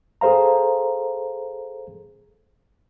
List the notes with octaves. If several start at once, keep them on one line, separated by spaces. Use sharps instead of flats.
G#4 A4 C5 F5 A#5